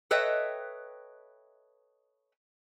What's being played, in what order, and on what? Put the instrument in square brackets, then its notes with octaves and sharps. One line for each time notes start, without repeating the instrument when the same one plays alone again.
[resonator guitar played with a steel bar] A4 B4 C#5 D#5 E5 G5